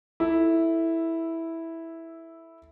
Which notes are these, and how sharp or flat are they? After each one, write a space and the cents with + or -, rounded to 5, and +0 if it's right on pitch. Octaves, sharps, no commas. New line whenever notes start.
E4 -5 A4 +0